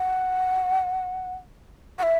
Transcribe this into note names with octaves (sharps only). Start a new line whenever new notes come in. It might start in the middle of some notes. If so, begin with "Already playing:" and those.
Already playing: F#5
F#5
E5